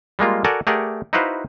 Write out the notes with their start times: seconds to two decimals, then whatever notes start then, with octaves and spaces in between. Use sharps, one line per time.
0.19 G3 G#3 A#3 F4
0.44 F#4 A4 A#4 D5 F#5 G#5
0.67 A3 G4 G#4 A#4 D5 F#5
1.13 D#4 E4 F#4 B4 C5 F5